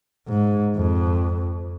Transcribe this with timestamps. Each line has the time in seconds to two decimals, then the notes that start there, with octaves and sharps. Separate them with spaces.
0.29 G#2
0.75 F2